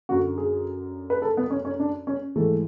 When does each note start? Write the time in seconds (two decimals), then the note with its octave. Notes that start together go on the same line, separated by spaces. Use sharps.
0.09 F#2 D3 F#4
0.38 G#4
1.10 B4
1.22 A4
1.37 B3
1.50 C#4
1.65 C#4
1.79 D4
2.07 C#4
2.35 G#2 E3 A3